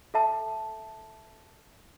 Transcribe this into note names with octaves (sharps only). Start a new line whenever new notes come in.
A4 E5 A5